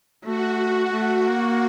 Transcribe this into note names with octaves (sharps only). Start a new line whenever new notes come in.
A3 F#4
F#4
A3
A#3